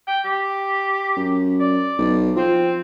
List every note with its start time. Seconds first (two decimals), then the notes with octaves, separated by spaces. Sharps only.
0.07 G5
0.25 G4
1.17 F#2
1.60 D5
1.99 B1
2.37 F3 C4